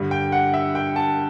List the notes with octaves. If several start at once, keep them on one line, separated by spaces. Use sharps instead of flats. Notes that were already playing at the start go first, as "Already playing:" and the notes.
Already playing: G2 D3
G5
F#5
E5
G5
A5